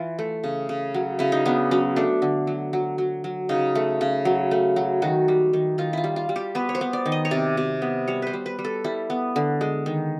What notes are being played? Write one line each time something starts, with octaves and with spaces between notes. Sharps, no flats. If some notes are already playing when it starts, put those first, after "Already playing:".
Already playing: E3 F4
A3
C#3
C#3
F#3
C#3 E4
D#4
B3 D4
F#3 C#4
A3 D4
D3
F#3
F#3
F#3
F#3
C#3 D#4
A3
C#3
F#3
A3
F#3
D#3 F#4
G3
D#3
D#3 F4
E4 F4
G3
F4
G3
G4
B3 B4
C#5
C5
B3
D5
D#3
D#5
C#5
C3 D5
C3
B3
G3 C#5
B4 C5
G3
B4
G3
A4
G3 E4
B3
D3
G#3
D#3